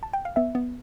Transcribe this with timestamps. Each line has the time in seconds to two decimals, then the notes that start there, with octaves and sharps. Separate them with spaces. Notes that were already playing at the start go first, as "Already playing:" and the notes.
0.03 A5
0.13 G5
0.25 F5
0.36 B3 E5
0.55 B3